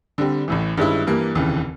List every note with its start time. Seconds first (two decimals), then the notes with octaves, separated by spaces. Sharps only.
0.18 D3 G3 C4
0.48 A1 A2 E3
0.77 G2 D#3 G#3 C#4 E4
1.07 G2 E3 G3 A#3
1.35 F1 D#2 C#3 E3